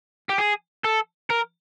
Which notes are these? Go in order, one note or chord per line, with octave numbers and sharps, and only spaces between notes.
G4
G#4
A4
A#4